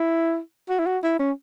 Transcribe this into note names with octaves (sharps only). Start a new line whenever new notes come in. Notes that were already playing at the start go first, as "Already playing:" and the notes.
Already playing: E4
F#4
E4
F#4
E4
C#4